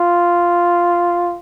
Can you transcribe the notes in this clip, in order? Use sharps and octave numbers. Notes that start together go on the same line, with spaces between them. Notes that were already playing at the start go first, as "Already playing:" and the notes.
Already playing: F4